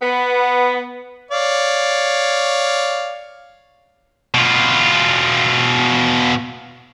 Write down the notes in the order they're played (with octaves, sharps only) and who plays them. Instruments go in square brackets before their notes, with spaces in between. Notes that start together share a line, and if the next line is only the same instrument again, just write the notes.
[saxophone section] B3
[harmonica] C#5 D5 F5
[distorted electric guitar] B2 F4